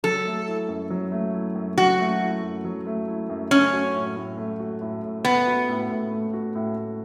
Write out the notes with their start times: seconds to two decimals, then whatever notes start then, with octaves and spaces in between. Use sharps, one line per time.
0.03 F#3 A4
0.25 A3
0.47 E4
0.69 F#2
0.90 F#3
1.12 A3
1.34 E4
1.55 F#2
1.78 F#3 F#4
1.99 A3
2.21 E4
2.43 F#2
2.65 F#3
2.86 A3
3.08 E4
3.29 F#2
3.51 A3 C#4
3.73 F#4
3.94 A2
4.16 A2
4.38 A3
4.60 F#4
4.82 A2
5.03 A2
5.25 A3 B3
5.47 F#4
5.69 A2
5.90 A2
6.12 A3
6.33 F#4
6.55 A2
6.77 A2